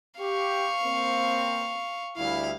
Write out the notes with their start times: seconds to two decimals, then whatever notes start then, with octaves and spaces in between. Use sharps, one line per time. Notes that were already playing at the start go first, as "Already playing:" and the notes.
0.20 G4 F5 C#6
0.84 A#3 C4
2.17 D2 G3 E4 F5